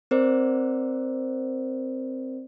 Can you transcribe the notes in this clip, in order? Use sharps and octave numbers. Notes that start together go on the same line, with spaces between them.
C4 A#4 C5 D5